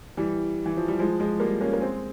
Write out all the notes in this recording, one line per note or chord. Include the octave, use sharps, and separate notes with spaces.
E3 G3
E3
F3
G3
F3 G#3
F3 G#3
G3 A#3
A#3 C#4
A#3
G#3 C4